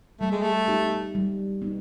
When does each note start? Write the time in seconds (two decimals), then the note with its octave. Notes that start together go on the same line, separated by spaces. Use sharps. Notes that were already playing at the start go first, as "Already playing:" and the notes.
0.20 G3 A3
0.32 G#3
0.42 A3
0.68 B3 D#4 G4
1.15 G3
1.62 B3 D#4